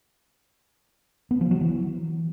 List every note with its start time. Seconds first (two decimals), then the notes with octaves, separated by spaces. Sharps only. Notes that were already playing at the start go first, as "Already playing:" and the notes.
1.31 B3
1.41 F3
1.51 F#3
1.61 E3